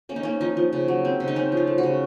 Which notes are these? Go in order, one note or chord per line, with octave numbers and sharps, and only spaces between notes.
A#3 C#4
D#4
A#3 C#4
F3 D#4
F3
C#3
F#3
C4
C#3
D#4
C4 C#4
F3 F4
A3
F#4
C#3